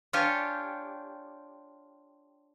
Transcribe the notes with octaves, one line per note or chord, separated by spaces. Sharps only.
D4 F4 G4 C#5 G#5